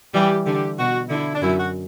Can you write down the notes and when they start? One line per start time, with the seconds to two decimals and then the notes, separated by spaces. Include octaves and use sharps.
0.14 E3 G3 G4
0.46 D3 G4
0.78 B2 F#4
1.09 D3 E4
1.35 D4
1.42 F#2 E4
1.58 F#4